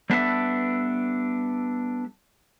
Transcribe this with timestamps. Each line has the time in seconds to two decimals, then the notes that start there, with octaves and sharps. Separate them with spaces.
0.10 G3 B3 D4 A4 B4 E5